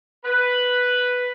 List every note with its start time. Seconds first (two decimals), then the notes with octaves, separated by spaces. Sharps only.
0.25 B4